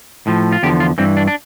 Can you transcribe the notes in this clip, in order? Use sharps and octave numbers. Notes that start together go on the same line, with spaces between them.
A2 F3
F4
E2 D3 F3 G4
F4
G2 E3 C4
D4
D4